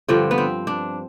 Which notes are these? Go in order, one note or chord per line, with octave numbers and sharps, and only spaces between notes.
G2 D3 F3 C4
B3
C4
D4